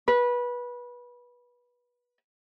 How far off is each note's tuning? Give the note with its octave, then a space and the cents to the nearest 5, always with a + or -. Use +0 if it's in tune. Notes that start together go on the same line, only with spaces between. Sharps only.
B4 -20